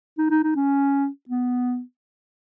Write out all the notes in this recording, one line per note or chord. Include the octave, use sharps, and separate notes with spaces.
D#4
D#4
D#4
C#4
B3